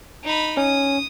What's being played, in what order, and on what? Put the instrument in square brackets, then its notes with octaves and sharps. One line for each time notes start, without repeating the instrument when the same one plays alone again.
[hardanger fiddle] D#4 B5
[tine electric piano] C#4 [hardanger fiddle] D#6